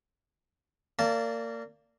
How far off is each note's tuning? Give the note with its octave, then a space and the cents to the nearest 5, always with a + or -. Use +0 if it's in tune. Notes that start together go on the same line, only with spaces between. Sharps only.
A#3 -25 D5 -15 A5 +0